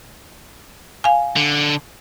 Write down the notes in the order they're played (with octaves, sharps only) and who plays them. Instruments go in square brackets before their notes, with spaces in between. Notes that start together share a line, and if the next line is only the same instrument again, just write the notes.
[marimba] F5 G#5
[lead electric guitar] D3